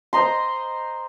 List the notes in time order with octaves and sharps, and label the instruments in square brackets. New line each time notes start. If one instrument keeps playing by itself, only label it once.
[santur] C5 D#5 A#5 C6